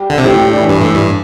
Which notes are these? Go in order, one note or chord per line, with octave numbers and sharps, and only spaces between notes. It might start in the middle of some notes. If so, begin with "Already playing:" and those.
Already playing: G3 G4
D3
C3
A2 G3 G4
G3 G4
D4
E3 E4
G2
A2
G2